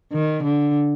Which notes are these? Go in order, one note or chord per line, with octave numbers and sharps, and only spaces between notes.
D#3
D3